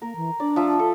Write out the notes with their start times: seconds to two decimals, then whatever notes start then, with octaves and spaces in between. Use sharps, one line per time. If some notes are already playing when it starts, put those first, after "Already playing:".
0.02 A#3 A#4
0.16 E3
0.40 D4 D5
0.56 F3 E5 A5
0.79 A4